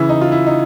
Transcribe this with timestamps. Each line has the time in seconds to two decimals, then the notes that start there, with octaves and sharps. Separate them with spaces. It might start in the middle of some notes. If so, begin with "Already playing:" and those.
Already playing: C#3 E3 E4
0.09 D#4
0.21 F4
0.32 E4
0.47 D#4